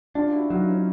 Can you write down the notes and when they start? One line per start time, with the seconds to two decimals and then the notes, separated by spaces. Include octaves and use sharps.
0.15 D4 F4 G4
0.28 F4
0.33 E4 F#4
0.50 F#3 D#4 F4
0.68 C#4